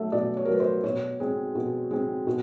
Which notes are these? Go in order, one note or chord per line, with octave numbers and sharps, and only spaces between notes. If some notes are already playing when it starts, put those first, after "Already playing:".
Already playing: B2 F#3 A3 E5
B2 D5
C#5
A#4
F#3 A3 B4
C5
B2 C#5
G#3 C4
B2
G#3 C4
B2